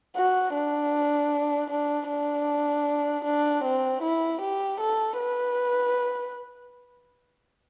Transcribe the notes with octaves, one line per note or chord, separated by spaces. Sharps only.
F#4
D4
D4
D4
D4
C4
E4
G4
A4
B4